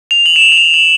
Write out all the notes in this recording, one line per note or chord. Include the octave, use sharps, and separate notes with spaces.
F7
F#7
E7
F7
F7
F#7
F#7